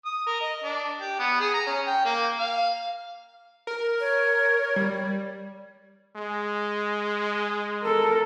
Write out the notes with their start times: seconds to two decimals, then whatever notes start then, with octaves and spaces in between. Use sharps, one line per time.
0.05 D#6
0.26 A#4
0.41 D#5
0.64 D4
0.99 G4
1.19 B3
1.40 G#4
1.54 A#5
1.66 C#4
1.86 G5
2.05 A#3
2.38 F5
3.67 A#4
4.00 C#5
4.76 G3
6.17 G#3
7.82 A4 A#4